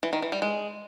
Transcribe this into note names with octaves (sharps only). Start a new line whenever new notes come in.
E3
D#3
E3
G3
G#3